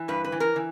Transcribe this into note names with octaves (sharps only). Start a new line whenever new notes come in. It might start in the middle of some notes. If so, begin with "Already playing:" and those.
Already playing: E3
G2 B4
B4
E3
A#4
E3